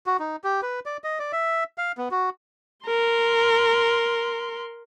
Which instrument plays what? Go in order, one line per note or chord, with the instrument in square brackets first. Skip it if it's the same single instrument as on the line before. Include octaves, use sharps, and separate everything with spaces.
[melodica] F#4
D#4
G4
B4
D5
D#5
D5
E5
F5
B3
F#4
[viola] A#4 C6